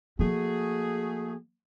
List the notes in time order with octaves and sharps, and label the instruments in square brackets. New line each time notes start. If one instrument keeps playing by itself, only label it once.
[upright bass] F3 A#3 [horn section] A3 F#4 G#4